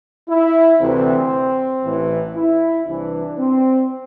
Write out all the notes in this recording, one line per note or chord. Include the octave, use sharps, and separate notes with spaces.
E4
D2 C3 E3 C4
A1 A2 E3
E4
C2 C3 E3 D4
C4